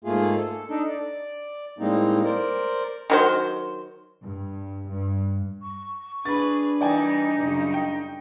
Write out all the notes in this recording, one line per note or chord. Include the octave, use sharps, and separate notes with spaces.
G#2 A3 A#3 F4 G#4
A4
D4 D#4 A4
D5
A2 G3 G#3 A#3 C4 D#4
A#4 C5 D5
D#3 F#3 C5
G2
G2
C#6
D4 G#4 B4 B5 A6
E3 G3 D#4 D5 G5 G#5
F#2 C#3 G3
G5